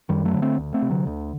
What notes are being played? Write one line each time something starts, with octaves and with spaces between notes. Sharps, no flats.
F#2 D#3 G3
F#3 A3
D3
A3 C4
D2
A3 C4
C3
D3 F#3
D2